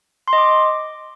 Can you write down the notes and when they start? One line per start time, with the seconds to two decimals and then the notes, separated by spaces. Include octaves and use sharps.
0.28 C6
0.33 D#5
0.38 D6